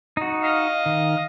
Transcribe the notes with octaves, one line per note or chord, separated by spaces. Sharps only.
D#4 F#4
D#5 F5
D#3